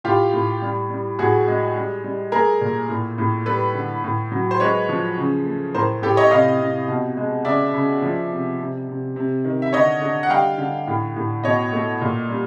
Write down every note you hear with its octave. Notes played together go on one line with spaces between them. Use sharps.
A2 F4 G4
A2
G3
G3
A2 F#4 G#4
G#3
G3
G3
A3 G#4 A#4
A#2
A2
A2
G3 A4 B4
D3
A2
F#3
C5
G#3 B4 C#5
F3
C#3
A3
A2 A#4 C5
A2 G4 A4
C#5 D#5
C3 D#5 F5
C3
B2
G#3
C#3 D5 E5
C#3
F3
C3
C3
C3
C3
D#3
E5
D3 C#5 D#5
D3
F#5
G3 F5 G5
D3
A2
A2
B2 C#5 D#5
A3
A#2
G3